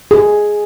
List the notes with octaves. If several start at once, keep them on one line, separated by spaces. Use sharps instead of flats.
G#4